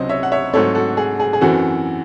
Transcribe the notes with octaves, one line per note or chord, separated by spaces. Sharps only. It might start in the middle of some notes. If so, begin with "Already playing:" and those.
Already playing: C#2 C3 F#3 C#4 C5 D#5
C#5 E5
F#5
C#5 E5
G#2 F#3 A3 C4 A4 C#5
F#4 A4
G#4
G#4
G#4
F#2 E3 C4 F#4 A4